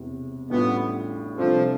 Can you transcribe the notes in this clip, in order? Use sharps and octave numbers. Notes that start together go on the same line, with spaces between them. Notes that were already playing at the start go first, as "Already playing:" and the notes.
Already playing: E1 E2 C3
A1 A2 G3 B3 D4 F4
C3 F3 G3 D4 A4 C5